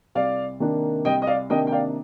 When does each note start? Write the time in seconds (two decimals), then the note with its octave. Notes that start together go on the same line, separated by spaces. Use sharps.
0.15 C2 D5 F5
0.60 C3 D#3 A#3 D4
1.05 C2 D#5 G5
1.22 D#5
1.27 D5 F5
1.50 C3 D#3 A#3 D4 D#5 G5
1.67 G5
1.72 D5 F5